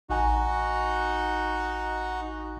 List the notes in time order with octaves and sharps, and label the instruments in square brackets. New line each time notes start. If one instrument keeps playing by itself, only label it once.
[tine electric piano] A1 G#5 [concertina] D#4 F#4